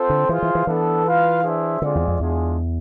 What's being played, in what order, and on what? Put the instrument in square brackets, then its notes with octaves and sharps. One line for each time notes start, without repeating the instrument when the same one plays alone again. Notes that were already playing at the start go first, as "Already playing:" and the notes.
Already playing: [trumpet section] C4 F4 A4 C5
[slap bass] D3
[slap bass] E3 [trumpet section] F4 G#4 C5 F5
[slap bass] E3
E3
[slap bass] E3 [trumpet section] B3 D4 A4
[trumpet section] F4 B4 F5
D4 G#4 C5 E5
[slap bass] D3 [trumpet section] G#3 C4 F4 G#4 D5
[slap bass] E2
F2
[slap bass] E2 [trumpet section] G#3 D4 F4 G#4